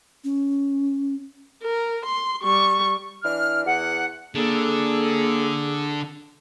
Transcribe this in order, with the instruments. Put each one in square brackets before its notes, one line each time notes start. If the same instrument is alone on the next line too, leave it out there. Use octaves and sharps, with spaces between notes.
[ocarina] C#4
[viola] A#4
C6
G3 C#6
[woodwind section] E3 D4 F6
E2 F#5
[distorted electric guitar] D3 [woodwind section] A#3 A4 [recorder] G#4